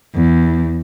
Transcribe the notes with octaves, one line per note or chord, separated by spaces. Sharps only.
E2